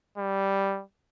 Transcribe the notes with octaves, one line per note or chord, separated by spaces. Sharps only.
G3